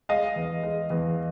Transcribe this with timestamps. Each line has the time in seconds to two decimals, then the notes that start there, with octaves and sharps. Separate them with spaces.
0.09 G#3 D#5 F5
0.36 E2
0.63 G#3
0.90 E2